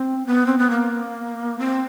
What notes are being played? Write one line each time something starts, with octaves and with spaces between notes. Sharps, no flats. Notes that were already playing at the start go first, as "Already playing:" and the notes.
Already playing: C4
B3
C4
B3
A#3
C4